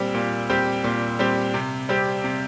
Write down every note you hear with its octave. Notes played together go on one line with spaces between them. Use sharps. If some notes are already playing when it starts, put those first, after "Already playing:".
Already playing: A#2 G3 C4 G4
A#2
G3 C4 G4
A#2
G3 C4 G4
C3
G3 C4 G4
C3